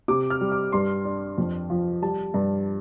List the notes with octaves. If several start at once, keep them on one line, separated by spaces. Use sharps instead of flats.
C3 D6
F6
G3
D6
G2 C6
D4
F2
F3
G3 A5
G2